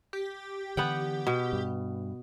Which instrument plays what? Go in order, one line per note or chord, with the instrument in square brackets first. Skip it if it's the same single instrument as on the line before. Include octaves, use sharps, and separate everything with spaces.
[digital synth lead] G4
[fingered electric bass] D3 E3 [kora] B3 F#5 G5
[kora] B2
[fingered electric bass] G2